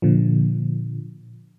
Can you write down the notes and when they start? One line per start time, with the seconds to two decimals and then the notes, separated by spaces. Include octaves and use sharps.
0.02 A#2 D3 F3